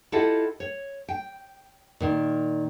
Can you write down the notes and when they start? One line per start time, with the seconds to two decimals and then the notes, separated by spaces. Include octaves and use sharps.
0.12 E4 F4 G4 A4 D#5 F#5
0.60 C#5
1.09 G5
2.00 A#2 D#3